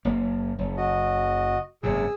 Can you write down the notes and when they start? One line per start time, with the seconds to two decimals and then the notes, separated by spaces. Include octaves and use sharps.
0.05 F#1 A#3
0.58 F#1
0.77 F#4 D#5
1.83 F#1 G#2 C3 G#4 E6